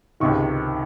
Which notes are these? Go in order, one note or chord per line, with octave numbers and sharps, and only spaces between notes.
C#2 C3 D#3 C#6